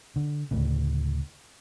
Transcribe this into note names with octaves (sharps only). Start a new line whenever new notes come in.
D3
D2 A2 C#3